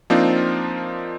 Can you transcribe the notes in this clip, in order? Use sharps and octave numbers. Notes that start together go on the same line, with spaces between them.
F3 A#3 C4 D4 D#4 F4